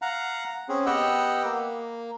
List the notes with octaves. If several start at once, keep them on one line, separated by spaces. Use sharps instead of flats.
F5 F#5 A#5
C4 C#4 G#4
B3 G4 D#5 F#5 G5 E6
A#3